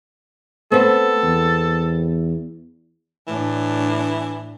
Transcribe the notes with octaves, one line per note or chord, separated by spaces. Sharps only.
A3 B3 C4 A4
E2
A2 E3 D4